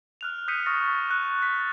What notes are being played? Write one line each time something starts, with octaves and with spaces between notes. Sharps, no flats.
F6 F#6 F7
D#6 F#6 G6 B6 C#7 D#7
C#6 D#6 F6 A6 A#6
C#6
F#6
F#6 A6 B6